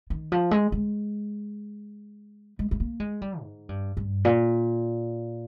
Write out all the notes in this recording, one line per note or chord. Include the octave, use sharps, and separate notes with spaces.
D#3
F3
G#3
G#3
G#3
G#3
A#3
G#3
G3
G#2
G2
G2
A#2